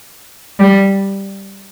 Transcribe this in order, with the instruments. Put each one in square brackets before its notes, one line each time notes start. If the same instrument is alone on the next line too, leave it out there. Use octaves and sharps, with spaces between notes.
[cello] G3